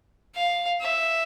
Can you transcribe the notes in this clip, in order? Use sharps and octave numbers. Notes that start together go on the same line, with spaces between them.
F5
E5